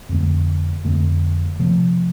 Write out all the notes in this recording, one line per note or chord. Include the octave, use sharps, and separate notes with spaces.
F2 D3 A3
F2 D3 A3
C3 F3 A3